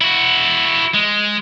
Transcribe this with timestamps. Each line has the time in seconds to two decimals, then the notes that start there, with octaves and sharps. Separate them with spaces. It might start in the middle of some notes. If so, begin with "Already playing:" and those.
0.01 E4 F#4
0.94 G#3